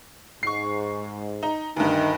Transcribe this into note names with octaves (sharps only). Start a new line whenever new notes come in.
G#2 C#6 C7
D#4
D2 G2 D#3 D#4